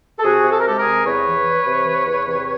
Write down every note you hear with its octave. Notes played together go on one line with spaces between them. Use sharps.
A4
C3 F#4 G#4
C3
A4
A#4
G#3 G4 A4
G#4 A#4
C3
E2 B4 C#5
E3
E3
C3
E3
E2
C3